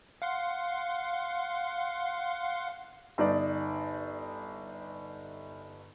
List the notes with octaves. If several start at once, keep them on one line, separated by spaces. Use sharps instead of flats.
F5 F#5 C6
G1 D#4 D5